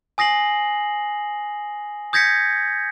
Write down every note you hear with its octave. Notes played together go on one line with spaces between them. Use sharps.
G#5 D#6 A#6 C7 F#7
D#6 G6 G#6 A#6 B6 C#7